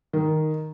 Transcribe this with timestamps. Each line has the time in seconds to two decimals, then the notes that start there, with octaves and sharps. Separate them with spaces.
0.13 D#3